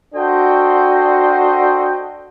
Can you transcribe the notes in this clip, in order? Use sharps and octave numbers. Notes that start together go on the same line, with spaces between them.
D4 F#4 A4 C5 D#5 G5